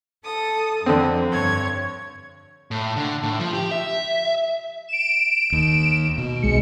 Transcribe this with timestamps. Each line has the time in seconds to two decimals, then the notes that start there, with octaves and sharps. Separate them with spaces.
0.23 A4 A5 D#6
0.86 F2 D3 C4
1.31 G2 C#5 G#6
2.71 A2
2.96 D3
3.23 A2
3.40 F3
3.53 G4
3.71 E5
4.88 D7 E7
5.52 D#2
6.18 B2
6.42 B1 G#3 C#7